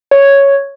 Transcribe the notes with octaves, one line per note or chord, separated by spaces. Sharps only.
C#5